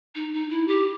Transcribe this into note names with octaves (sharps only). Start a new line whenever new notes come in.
D#4
D#4
E4
G4